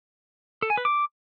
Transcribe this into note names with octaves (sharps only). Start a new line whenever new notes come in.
A4
G#5
B4
D6